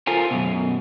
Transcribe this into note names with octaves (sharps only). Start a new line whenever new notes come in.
F4 A4 A#4 C5 G#5
F#2 B2